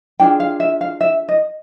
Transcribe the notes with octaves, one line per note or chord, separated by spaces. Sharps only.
D4 F4 G#4 G5
F5
E5
F5
E5
D#5